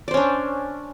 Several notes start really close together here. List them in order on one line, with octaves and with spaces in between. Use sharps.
D5 C5 C#4 D4